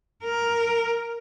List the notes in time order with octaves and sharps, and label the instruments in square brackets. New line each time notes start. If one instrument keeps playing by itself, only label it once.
[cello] A#4